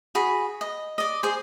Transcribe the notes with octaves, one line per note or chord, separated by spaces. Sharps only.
F#4 G#4 B5
D#5
D5 D#5
G#4 C5